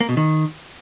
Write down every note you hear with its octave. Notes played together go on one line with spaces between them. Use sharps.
A#3
B2
D#3